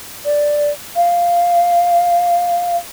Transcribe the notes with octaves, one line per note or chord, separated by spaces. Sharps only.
D5
F5